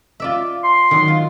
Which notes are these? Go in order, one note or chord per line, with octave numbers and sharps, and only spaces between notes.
F4 D5 E5
C6
D#3 F#3
F4